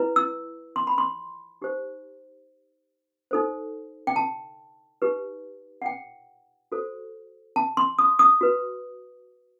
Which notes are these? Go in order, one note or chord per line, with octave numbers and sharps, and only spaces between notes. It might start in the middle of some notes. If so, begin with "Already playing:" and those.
Already playing: E4 B4
E6
C6
B5
C6
D#4 G4 C5
D#4 A4 C5
G5
A5
D#4 G4 B4
F#5
G5
F#4 A4 C5
A5
C6
D#6
D#6
F#4 B4